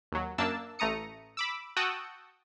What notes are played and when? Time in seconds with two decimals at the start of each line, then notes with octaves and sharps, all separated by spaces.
0.12 D#2 F#3
0.38 F#2 A#3 D4 A5 E6
0.79 A1 A3 A#5 D#6 C#7
1.37 B5 D6 E6
1.77 F#4 F#5 G5 A5 D#6 E6